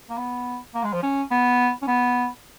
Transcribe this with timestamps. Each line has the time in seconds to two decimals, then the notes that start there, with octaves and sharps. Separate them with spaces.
0.10 A#3
0.18 B3
0.74 A#3
0.84 G#3
0.93 F3
1.03 C#4
1.31 B3
1.82 C#4
1.87 B3